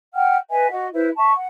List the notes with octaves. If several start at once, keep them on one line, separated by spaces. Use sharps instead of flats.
F#5 G5 F6
B4 D#5 E5 G#5
F#4 D#5 F#5
E4 B4 C5 E5
E5 A5 C#6
F#5